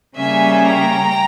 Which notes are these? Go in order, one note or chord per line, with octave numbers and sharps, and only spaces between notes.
C#3 G3 A#3 C#4 E5 G#5
G5 A#5